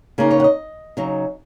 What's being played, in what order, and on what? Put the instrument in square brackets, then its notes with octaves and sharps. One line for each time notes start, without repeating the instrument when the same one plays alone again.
[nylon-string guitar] C#3 A#3 D#4 G#4
C#5
F#5
D#5
C#3 F#3 D#4